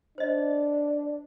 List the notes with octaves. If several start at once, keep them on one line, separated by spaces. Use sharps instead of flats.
D4 C5 D#5